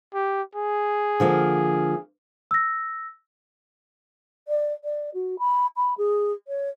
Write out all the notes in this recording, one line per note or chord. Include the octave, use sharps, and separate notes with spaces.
G4
G#4
D3 F3 A#3
E6 A#6
D5
D5
F#4
B5
B5
G#4
C#5